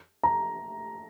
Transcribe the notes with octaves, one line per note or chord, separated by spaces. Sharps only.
A#5